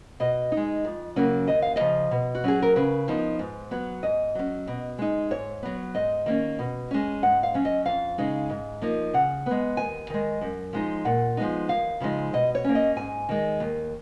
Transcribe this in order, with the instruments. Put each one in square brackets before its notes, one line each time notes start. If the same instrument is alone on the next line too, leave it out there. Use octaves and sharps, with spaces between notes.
[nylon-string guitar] B2 D#5
D#4
G#3
F2
C#3 F#3 A#3 C#4
D#2 D#5
F5
C#3 F3 D#5
B2
F#4
F#3 C#4 G#4
A#4
C#3 B4
F3 B3 D#4
G#2
F#3 B3
G#2 D#5
F#3 C#4
B2
G#3 D#4
G#2 C#5
F#3 B3
G#2 D#5
D#3 A#3 C#4
B2
G#3 C#4
G#2 F#5
F5
F#3 C#4
D#5
F2 F5
C#3 G#3 D#4
G#2
F3 A#3 D#4
C#3 F#5
G#3 B3
D#2 G#5
D#3 G#3
F#2
F3 G#3 D#4
A#2 F#5
F3 G#3 B3 D#4
D#2 F5
C#3 F3 G#3 D#4
B2 D#5
C#5
A#3 C#4
D#5
G#2 G#5
D#3 G#3
D#2